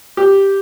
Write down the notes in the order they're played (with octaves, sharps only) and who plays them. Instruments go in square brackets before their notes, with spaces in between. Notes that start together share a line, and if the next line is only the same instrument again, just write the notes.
[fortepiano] G4